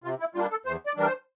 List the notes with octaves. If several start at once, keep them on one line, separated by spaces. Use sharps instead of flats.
C3 F4
E4
G3 A#3 D4 F4
A4
E2 C5
D5
E3 G3 D4 A#4
C5